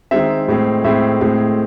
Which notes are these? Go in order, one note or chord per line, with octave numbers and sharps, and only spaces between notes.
D#3 G#3 C4 E5
A2 G#3 C4
A2 G#3 C4 E5
A2 G#3 C4